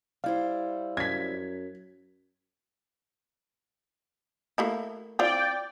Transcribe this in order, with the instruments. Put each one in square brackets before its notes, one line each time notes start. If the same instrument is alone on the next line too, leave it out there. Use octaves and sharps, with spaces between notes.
[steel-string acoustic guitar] G3 E4 C5 [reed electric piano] F5
[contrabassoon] F#2 [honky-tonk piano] G#6 B6
[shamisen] A3 A#3 E4
[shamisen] C4 E4 F4 [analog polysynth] D5 G5